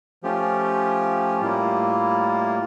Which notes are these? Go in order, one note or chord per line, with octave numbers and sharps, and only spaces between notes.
F3 A3 C#4 F4 G4
A2 G3 A#3 E4 F4